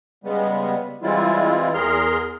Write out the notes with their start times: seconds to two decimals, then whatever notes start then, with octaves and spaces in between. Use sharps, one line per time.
0.24 C#3 G3 G#3 B3
1.03 E3 G3 G#3 C4 E4 F4
1.74 E2 G#4 A#4 C6 F6